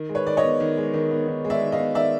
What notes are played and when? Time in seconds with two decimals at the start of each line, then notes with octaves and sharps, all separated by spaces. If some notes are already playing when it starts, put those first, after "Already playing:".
Already playing: D#3
0.09 G#3
0.15 B4 C#5
0.26 D#3 D5
0.37 C#5 D#5
0.43 B3
0.60 D#3
0.77 G#3
0.94 D#3
1.11 B3
1.28 D#3
1.45 G#3
1.50 D5 E5
1.61 D#3
1.72 D#5 F5
1.78 B3
1.95 D#3 D5 E5